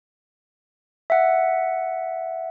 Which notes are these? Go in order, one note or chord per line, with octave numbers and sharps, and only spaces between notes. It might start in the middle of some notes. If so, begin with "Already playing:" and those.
E5 F#5